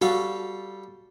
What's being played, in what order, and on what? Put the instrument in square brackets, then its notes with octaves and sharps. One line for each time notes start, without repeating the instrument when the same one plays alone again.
[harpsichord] G3 A4 F5 [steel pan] F#4